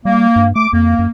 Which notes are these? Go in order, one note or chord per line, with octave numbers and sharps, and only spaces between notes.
G3 A#3
G2
A3 D6
F2 A#3
F#2